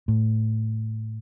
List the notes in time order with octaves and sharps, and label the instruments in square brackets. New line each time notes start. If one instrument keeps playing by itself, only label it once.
[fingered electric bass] A2